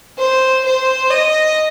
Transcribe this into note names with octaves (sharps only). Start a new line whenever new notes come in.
C5
C5
D#5